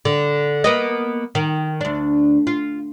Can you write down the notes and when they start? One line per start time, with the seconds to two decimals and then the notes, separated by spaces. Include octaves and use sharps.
0.05 D3
0.64 A#3 B3 D#5
1.35 D#3
1.81 D2 D4
2.47 F4